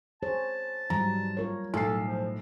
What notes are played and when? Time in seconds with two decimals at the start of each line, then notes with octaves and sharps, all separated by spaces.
0.23 G#4 C5 C#5 A5
0.90 G#2 E3 F#3 G3 A#5
1.37 F4 A#4 C#5
1.74 B1 A2 A4 C7
2.06 F3